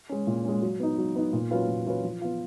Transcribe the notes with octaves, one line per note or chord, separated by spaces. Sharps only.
G#3 C#4
A#2
G#3 C#4
F#3
B3 D#4
F#3
B3 D#4
A#2
F#3 C#4 F4 B4
A#2
F#3 C#4 F4 B4
F3
B3 F4